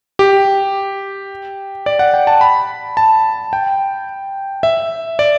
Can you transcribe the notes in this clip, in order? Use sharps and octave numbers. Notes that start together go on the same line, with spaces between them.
G4
D5
F#5
G5
A5
B5
A5
G5
E5
D5